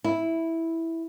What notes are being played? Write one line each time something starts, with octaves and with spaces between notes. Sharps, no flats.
E4